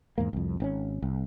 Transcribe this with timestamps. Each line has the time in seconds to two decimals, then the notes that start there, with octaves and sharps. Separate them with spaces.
0.18 E2 G#2 A#3
0.33 C2 F2
0.60 G#1 C4 C#4
1.02 C2